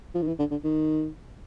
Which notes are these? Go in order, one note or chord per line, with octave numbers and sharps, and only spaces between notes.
F3
D#3
E3
D3
D3
D#3